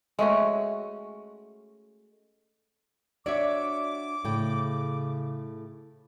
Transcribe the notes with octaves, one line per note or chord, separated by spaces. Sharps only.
G#3 A3 C#4 F#4
D4 F#4 C#5 D5 E5 D6
A2 C#3 G5